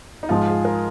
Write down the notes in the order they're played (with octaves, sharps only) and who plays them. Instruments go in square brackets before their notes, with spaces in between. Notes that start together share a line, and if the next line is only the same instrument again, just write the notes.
[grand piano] D#4
[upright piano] G#2 F3 G#3 [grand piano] F4
[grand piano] G#4
A#4